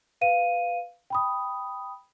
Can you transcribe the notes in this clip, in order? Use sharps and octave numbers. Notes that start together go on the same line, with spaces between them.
B4 F5 D#7
G5 B5 D#6